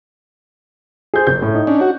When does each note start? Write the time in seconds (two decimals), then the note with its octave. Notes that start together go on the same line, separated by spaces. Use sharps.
1.14 G#4 C5 G6
1.27 F#1 G6
1.42 A2
1.55 D#4
1.67 C#4 D4
1.81 F#4